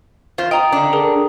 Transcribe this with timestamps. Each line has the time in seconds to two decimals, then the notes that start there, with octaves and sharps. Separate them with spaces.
0.38 E2 F4 C5
0.51 D#5 G5 A#5 D#6
0.72 D3 D4
0.93 G#4 A#4 D#6